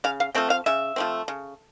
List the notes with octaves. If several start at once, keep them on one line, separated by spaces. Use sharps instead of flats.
C#3 F5
F5
F3 A3 C4 G5
F5
C#3 E5
F3 A3 C4
C#3